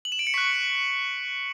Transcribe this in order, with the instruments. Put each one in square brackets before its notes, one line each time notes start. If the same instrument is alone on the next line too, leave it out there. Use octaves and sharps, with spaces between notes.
[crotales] F#7
E7
D7
C#7
C#6 F#6 B6